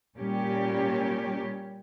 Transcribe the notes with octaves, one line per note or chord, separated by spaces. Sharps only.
A#2 G3 C#4 G4